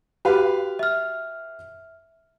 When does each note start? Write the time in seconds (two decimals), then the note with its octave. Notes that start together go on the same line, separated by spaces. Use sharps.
0.25 F#4 G4 B4 F5
0.79 E5 F6